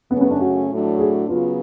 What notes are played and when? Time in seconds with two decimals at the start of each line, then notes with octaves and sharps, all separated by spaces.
0.11 F#2 C#3 F#3 A3 B3 C#4
0.21 B3
0.31 D4
0.41 F#4
0.69 A2 F#3 A3 D4 F#4
0.99 G#4
1.28 C#3 F#3 B3 F4